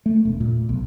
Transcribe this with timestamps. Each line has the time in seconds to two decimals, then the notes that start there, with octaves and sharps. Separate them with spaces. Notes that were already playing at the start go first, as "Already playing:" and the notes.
0.06 A3
0.25 E1
0.40 A#2
0.69 B1